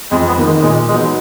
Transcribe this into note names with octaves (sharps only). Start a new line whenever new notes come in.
F2 G#3
B3
D#3 A#3
G#3
A#2 G#3
F#3 G#3 B3 D#4